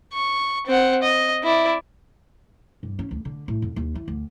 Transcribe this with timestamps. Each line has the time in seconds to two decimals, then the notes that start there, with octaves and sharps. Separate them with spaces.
0.14 C#6
0.67 C4 F#5
1.02 D#5
1.44 E4 D5
2.83 G2
2.99 C#4
3.11 D2
3.25 D3
3.48 A2
3.62 F2
3.76 D#2
3.95 E3
4.08 D2